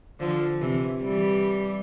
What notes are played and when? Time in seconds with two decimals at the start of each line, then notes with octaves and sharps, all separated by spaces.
0.20 D3 F3
0.60 C3 E3
1.02 E3 G3